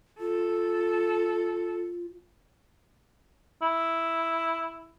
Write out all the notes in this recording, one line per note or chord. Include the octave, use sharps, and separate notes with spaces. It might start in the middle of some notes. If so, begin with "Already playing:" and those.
F4 A4
E4